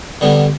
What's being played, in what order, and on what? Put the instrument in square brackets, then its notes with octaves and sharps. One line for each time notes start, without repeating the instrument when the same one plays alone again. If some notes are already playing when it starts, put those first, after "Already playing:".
[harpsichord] D3 G3 B3 D4